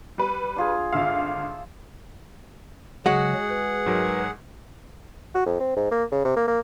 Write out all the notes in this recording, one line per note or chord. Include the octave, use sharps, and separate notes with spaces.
G3 B4
D4 F4 G#4
G#1 D3 F4 E5 F5
C#3 F#3 G#3 F#4 G#4 F#5
B4
G#2 F#3 A#4
F#4
F2
C4
G#2
A#3
C#3
C3
A#3
A#3